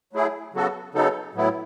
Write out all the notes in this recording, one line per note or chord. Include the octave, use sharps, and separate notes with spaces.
F#3 A3 E4 G#4
C#3 F#3 B3 F#4 A4
C#3 F#3 B3 D#4 A4
A2 F#3 B3 E4